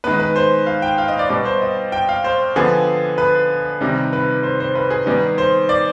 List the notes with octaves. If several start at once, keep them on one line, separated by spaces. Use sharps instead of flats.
D#3 G#3 B3 B4
B4
C5
F5
G5
F5
D#5
D5
B2 G3 B3 D5
C5
D#5
G5
F5
C5
D3 F3 B3 G#4
B4
C3 D#3 G3
B4
C5
C5
B4
G#4
D#3 G3 B3
C5
D5